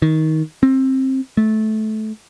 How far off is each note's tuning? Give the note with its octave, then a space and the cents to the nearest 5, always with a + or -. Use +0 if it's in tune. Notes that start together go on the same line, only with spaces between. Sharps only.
D#3 +20
C4 +20
A3 -20